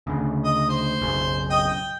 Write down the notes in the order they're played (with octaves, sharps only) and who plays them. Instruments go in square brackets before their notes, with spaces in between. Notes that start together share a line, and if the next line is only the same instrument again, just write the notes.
[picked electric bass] D2 C#3
[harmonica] D#5
C5
[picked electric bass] B1 F#2 C#3
[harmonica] D#5 G5 D#6
G5